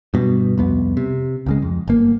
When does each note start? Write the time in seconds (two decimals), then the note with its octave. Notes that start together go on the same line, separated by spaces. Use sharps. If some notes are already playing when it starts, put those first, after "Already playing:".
0.14 G2 B2
0.58 C2 F2 B3
0.97 C3
1.46 C#2 C#3 G#3
1.62 F2
1.88 G1 A#3